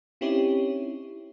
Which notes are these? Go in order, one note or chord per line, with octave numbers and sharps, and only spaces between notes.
C4 C#4 D#4 E4 G4 C#5